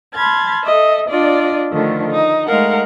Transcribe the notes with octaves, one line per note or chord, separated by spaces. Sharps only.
A5 B5 C6 F6 G#6 A6
A4 D#5 E5
D4 F4 D5 D#5
D3 D#3 F3 A3
D#4
G#3 A3 D#4 A#4 F5 F#5